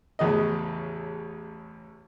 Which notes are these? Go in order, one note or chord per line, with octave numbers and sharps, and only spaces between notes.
A1 E2 C#3 D#5